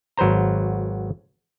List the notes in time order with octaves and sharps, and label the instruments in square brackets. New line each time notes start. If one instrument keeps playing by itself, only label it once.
[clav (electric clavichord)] G#1 F#3 B4 C5 A#5